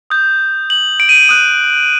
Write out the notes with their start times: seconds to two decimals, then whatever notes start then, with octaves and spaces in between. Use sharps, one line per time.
0.10 D#6 G6
0.70 F#7
1.00 D7
1.09 D#7
1.29 D#6 F#6